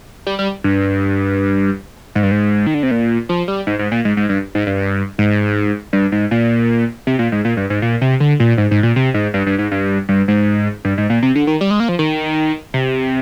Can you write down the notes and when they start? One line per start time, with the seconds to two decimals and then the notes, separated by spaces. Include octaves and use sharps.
0.27 G3
0.39 G3
0.64 G2
2.15 G#2
2.23 G2
2.31 G#2
2.67 D#3
2.74 D3
2.83 C3
2.91 A#2
3.29 F3
3.48 G3
3.67 G#2
3.79 G#2
3.92 A#2
4.05 G#2
4.17 G#2
4.29 G2
4.55 G#2
4.67 G2
5.18 G#2
5.93 G2
6.12 G#2
6.31 A#2
7.07 C3
7.19 A#2
7.32 G#2
7.45 A#2
7.57 G2
7.70 G#2
7.82 A#2
8.01 C3
8.20 D3
8.40 A#2
8.58 G#2
8.71 G#2
8.83 A#2
8.96 C3
9.14 G#2
9.34 G2
9.47 G2
9.59 G#2
9.71 G2
10.09 G2
10.28 G#2
10.85 G2
10.98 G#2
11.10 A#2
11.23 C3
11.35 D3
11.47 D#3
11.61 G3
11.71 G#3
11.80 A#3
11.89 F3
11.99 D#3
12.74 C3